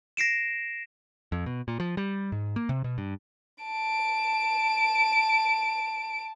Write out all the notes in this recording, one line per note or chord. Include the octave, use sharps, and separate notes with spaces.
A#6 C7 D7 E7
F2
B2
A#2
F3
G3
G#2
A#3
C3
B2
G2
A5 D7